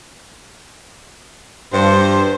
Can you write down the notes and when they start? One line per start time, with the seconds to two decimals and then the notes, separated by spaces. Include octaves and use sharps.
1.73 G2 C5